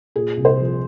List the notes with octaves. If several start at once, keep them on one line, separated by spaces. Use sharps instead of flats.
A#2 G#4
C2
C5
F3